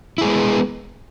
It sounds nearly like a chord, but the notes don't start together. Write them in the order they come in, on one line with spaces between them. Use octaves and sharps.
E4 G#4 G#3 B3